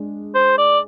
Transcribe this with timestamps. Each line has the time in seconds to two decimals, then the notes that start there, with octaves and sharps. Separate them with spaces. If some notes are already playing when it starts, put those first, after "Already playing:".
Already playing: G#3 D4
0.35 C5
0.58 D5